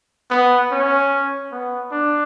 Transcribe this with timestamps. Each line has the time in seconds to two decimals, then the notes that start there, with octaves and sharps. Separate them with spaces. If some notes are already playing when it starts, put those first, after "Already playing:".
0.31 B3
0.71 C#4
1.52 B3
1.92 D4